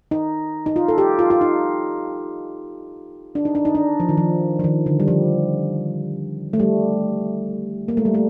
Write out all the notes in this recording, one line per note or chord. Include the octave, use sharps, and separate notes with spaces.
D#4
D#4
F4
A4
G4
F4
F4
D#4
D4
D#4
D4
D#4
D4
F3
D#3
F3
F3
D#3
D3
G3
F3
A3
G3
A#3
A3
G3
A3